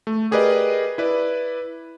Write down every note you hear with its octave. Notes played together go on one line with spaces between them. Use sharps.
A3
G4 G#4 A#4 B4 D5 D#5
E4 B4 D5